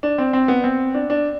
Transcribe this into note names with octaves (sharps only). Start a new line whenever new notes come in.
D4
C4
C4
B3
C4
D4
D4